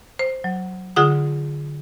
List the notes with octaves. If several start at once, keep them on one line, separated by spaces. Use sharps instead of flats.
C5
F#3
D3 F4 G#4 F#5 D#6